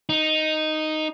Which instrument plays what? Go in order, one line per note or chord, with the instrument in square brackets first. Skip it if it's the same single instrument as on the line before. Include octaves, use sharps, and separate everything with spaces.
[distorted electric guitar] D#4